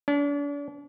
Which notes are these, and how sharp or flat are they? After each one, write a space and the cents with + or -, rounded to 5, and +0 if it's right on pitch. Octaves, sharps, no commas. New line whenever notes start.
D4 -40